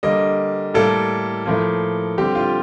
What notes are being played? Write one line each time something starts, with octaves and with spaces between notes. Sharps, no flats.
D3 G3 A#3 D#5
A2 G3 A#3 A4
A2 F3 A#3
D3 G3 C4 G4
F4